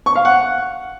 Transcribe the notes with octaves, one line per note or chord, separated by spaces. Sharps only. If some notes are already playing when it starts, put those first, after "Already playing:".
C#6
F5
F#5